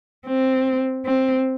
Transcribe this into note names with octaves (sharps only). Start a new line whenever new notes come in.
C4
C4